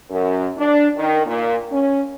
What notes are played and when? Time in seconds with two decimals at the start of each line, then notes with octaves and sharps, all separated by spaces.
0.10 F#2
0.57 D4
0.96 D#3
1.25 A#2
1.71 C#4